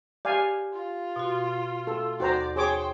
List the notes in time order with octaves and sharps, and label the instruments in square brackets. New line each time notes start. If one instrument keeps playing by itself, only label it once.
[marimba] G4 [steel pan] D5 F5 G#5
[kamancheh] F4
[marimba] B2 F#4
[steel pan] A4
[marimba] D#2 [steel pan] F#4 C5 A#5 [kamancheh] D5
[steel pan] G#4 C#5 D6 [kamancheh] C5 G5